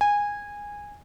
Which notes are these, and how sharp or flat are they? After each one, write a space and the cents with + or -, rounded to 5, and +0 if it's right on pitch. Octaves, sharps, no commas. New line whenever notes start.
G#5 -15